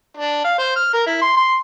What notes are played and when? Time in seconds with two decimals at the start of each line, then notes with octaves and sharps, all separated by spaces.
0.17 D4
0.44 F5
0.59 C5
0.76 F6
0.93 A#4
1.06 E4
1.22 C6
1.37 C6